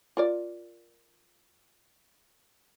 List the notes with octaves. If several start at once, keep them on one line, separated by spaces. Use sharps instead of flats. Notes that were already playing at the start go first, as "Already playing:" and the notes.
F4 A#4 D5